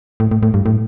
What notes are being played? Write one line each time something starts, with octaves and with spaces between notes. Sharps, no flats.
A2
A2
A2
G2
A2